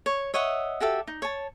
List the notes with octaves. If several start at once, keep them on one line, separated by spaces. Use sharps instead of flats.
C#5
C#5 D#5 E5 F#5
F#4 G4 A4 E5
D#4
C#5 A5